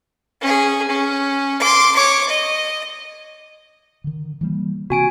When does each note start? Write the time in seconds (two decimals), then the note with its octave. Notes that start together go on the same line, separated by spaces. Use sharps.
0.41 C#4 G#4
0.88 C#4
1.60 C6 D6
1.95 C#5 D6
2.29 D#5
4.04 D3 D#3
4.41 E3 G3 A#3
4.90 C3 A#3 C4 F#4 G#5 D7